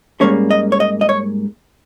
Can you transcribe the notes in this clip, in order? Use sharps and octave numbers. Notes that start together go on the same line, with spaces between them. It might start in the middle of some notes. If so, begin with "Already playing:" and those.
G#2 G3 A#3 C#4 C#5
D#5
C#5
D#5
D#5
C#5